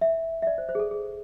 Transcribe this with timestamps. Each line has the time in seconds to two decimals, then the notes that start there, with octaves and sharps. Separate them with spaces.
0.01 E5
0.42 E5
0.47 D5
0.58 C5
0.69 C5
0.75 G#4
0.79 A4
0.91 G#4